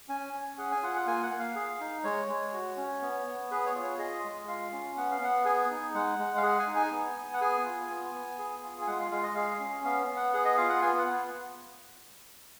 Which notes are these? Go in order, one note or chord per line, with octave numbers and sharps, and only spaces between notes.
C#4 G#5
C#4
G#4 F#5
G#5
F4 F#5
F#5
A#3 G#5
F#5
A#3
F5
G#4
D#4
G#3 C#5
G#3
F#4
C#4
B3
B3
G#4 B4
C#5
F4
C#5
G#4 D#5
G#3
F4 F5
C#4
B3 F#5
F5
B3 F#5
G#4 G#5
D#4
G#3 F#5
G#3
F5
G#4 F#5
G#5
D#4
G#5
B3
B3
F#5
G#4 G#5
F4
B3
B3
G#4
F4
G#5
G#3 F#5
F5
G#3 F5
D#5
G#4 F5
C#4
B3 F5
B3
F#5
G#4 F#5
D#5
F4 F5
F#5
B3 G#5
F#5
B3